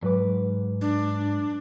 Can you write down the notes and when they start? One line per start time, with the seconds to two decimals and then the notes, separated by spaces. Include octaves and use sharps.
0.02 G#2 F#3 B4 D6
0.81 D4